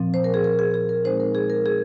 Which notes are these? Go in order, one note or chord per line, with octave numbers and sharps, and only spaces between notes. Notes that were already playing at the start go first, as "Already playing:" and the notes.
Already playing: A#2 F3 C4
C5
A#4
G#4
A#4
G#4
G#4
A#4
A#2 G#3 C4 D#4 C5
A#4
G#4
A#4
G#4